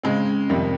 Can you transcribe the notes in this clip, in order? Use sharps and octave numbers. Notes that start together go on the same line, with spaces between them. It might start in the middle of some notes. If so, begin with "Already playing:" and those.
C#3 G#3 C4
F2 C3 D#3 G3